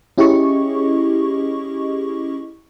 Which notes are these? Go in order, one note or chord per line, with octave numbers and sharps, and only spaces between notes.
C#4 E4 G4 G#4 D#5 C#6